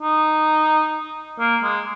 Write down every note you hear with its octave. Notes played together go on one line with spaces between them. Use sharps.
D#4
A#3
G#3